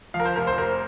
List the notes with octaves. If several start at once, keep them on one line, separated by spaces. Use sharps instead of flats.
F3 F5
A#4
C5
F1 A#4
C5
F1 A#4